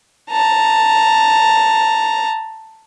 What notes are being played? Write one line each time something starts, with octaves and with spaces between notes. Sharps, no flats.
A5 A#5